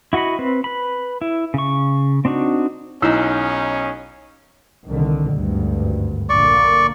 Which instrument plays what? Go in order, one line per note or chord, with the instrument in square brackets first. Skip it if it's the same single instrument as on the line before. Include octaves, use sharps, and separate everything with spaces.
[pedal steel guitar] E4 F#4 D#5 F#5 B5
C4 B4
B4 B5
E4
C#3 C#6
C4 D4 D#4 F#4
[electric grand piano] B1 D#4 [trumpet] C#4 [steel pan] E4 E6
[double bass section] C2 D3 D#3
G#1 D2 G2
[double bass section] A#1 D3 A#3 [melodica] D5 C#6